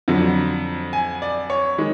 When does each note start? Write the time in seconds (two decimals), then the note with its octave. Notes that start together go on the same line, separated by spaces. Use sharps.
0.08 F2 D3 F#3
0.93 G#5
1.22 D5
1.50 C#5
1.78 D#3 G#3